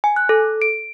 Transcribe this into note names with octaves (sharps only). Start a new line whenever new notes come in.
G#5
F#6
A4
D7